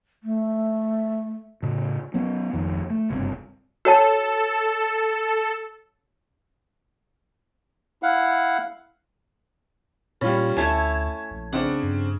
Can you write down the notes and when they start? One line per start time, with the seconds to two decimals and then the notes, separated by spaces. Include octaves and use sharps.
0.23 A3
1.63 A2 C#3
2.14 F#3 B3 C#4
2.53 G#1 F2 D#3
2.90 A3
3.10 F#1 C2 G2 C4
3.85 F#4 A4 C#5 A5
8.03 E4 F5 F#5
10.21 A#2 G3 C#4 F4 B5
10.57 D2 A3 E4 C#5 G#5 A5 G#6
11.31 A#1
11.53 C#3 C4 D4 F#5
11.83 G2